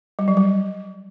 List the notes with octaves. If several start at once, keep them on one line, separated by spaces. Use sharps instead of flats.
G3
F#3
G3